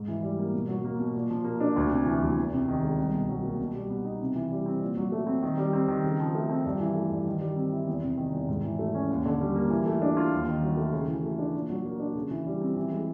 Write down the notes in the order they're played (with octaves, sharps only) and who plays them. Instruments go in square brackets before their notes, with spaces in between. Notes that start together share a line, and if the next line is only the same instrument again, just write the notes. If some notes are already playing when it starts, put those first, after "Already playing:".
Already playing: [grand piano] G#2
E3
G3
A#3
B2
F#3
A#3
B2
A#2
F3
A#3
D4
D2
C3
E3
D2
E2
C3
D#3
G#3
C2
B2
F#3
A#3
B2
G3
B3
D#4
C3
E3
G3
C4
A#2
F#3
A3
C4
D#3
G3
C4
D#3
C#3
F3
A3
C4
G2
E3
A3
G2
D#3
G3
C4
E4
E2
C3
D#3
E2
G#2
E3
A3
C#4
D#2
D3
G3
A#3
E3
A3
D4
F4
D#2
D#3
F#3
A3
C#3
E3
A3
D4
A#2
F#3
A#3
D4
C#3
E3
G3
C4
E3
G#3